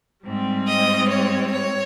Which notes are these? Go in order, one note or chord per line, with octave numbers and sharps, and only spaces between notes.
G#2 G3 C4
D#5
C#5
C#5